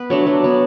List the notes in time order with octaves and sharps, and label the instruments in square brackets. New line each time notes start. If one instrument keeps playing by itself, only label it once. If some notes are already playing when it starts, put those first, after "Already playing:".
Already playing: [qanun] B3 B4
F#3 A3 D4 C#5
F#3
B3 D4